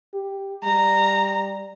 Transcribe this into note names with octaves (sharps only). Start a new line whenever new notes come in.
G4
G3 A#5